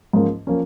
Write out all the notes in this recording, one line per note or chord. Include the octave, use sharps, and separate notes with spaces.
G#2 F3 A#3 C#4
F3 A#3 C#4